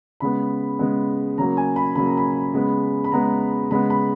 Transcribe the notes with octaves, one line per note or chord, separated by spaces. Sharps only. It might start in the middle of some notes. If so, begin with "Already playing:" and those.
C#3 G#3 B3 B5
C#3 G#3 B3
C#3 F#3 A#3 A#5
G#5
B5
C#3 F#3 A#3 B5
A#5
B5
C#3 G#3 B3
B5
C#3 G#3 B3 A#5
C#3 G#3 B3 B5
B5